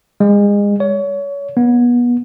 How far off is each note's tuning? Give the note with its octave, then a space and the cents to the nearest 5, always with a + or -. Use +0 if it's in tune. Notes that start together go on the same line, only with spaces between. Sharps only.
G#3 -30
C#5 +25
B3 -30